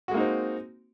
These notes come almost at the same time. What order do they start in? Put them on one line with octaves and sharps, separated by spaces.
F#4 G#3 A#3 D#4 C4